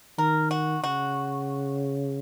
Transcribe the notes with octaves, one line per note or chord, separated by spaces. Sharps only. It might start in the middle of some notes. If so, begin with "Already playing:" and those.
D#3 A#4
F#4
C#3 F#4